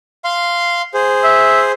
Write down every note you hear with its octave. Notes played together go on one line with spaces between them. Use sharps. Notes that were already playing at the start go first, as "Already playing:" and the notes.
F5 C6
G#4 C5
E5